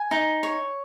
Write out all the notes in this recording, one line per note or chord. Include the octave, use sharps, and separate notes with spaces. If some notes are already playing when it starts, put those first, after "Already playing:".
Already playing: G#5
D#4
C#5